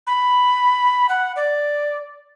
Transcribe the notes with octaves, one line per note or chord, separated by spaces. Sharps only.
B5
F#5
D5